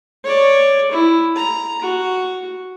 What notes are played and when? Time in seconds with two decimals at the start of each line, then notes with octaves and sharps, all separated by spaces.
0.24 C#5 D5
0.92 E4
1.36 A#5
1.82 F#4